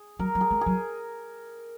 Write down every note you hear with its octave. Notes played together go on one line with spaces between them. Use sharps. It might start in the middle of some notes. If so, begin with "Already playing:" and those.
Already playing: G#4
F#3 A#4
F#3
G#4
G#3
G#4
F#3